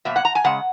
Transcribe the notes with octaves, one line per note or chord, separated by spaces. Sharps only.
B2 F#3 A#3 E5
F#5
A#5
G#5
C#3 G#3 F#5